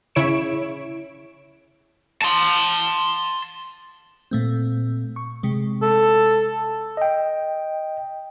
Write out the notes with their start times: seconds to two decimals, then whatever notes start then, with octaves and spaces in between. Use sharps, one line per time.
0.15 C#3 E4 C#5 C#6 D7 E7
2.22 A5 C6
4.31 A#2 A3 C4
5.16 C#6
5.43 C3 G#3
5.82 A4
6.97 D#5 G5